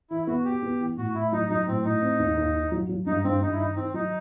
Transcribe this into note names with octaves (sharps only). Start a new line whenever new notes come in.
E3 E4
E4
B3 F#4
F#4 G4
B3
E3
A2 F#4
A2 E4
F#3 D#4
F#3 D#4
A2 C4
A2 D#4
C4
D#2
D#2
D#3
F#3
F#3
G2 D#4
G2 C4
G2 D#4
E4
D#3 D#4
D#3 C4
F#3 D#4